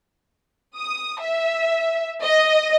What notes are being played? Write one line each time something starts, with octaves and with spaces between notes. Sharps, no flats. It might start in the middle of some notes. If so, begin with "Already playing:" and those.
D#6
E5
D#5